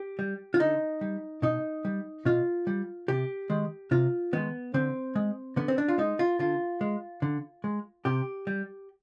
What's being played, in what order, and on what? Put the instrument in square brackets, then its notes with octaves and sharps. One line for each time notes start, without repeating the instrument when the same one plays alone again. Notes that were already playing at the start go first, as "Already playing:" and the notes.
Already playing: [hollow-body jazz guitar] G4
G3
F4
D3 D#4
G3
B2 D#4
G3
B2 F4
G3
C3 G4
D#3 G#3
C3 F4
D#3 G#3 B3
D3 C4
G#3
D3 B3
C4
D4
F4
G#3 D#4
F4
D3 F4
G#3
D3
G#3
C3 G4
G3